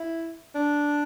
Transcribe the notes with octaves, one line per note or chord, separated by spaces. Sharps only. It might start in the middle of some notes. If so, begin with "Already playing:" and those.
Already playing: E4
D4